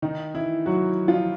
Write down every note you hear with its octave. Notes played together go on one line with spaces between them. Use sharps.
D#3 D#4
E3 E4
F#3 F#4
F3 F4